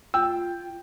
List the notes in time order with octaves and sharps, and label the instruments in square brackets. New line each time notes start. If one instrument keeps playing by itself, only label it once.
[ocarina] F4 [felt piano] G5 [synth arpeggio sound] E6